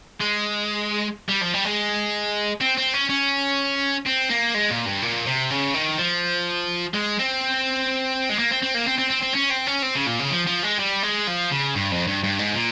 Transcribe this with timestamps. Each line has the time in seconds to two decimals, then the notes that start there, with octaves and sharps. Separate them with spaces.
0.21 G#3
1.29 G3
1.42 F3
1.54 G3
1.65 G#3
2.61 C4
2.78 C4
2.94 C#4
3.09 C#4
4.06 C4
4.30 A#3
4.54 G#3
4.71 A#2
4.86 G2
5.02 A#2
5.26 C3
5.51 C#3
5.74 D#3
5.98 F3
6.94 G#3
7.19 C4
8.29 G#3
8.39 A#3
8.51 C4
8.63 C4
8.75 A#3
8.86 C4
8.99 C4
9.10 C4
9.23 C4
9.35 C#4
9.51 C4
9.67 C#4
9.83 C4
9.95 C#3
10.06 A#2
10.19 C#3
10.30 F3
10.47 F3
10.63 G#3
10.79 G3
11.03 G#3
11.27 F3
11.51 C#3
11.75 G2
11.91 F2
12.07 G2
12.24 G2
12.39 G#2
12.55 A#2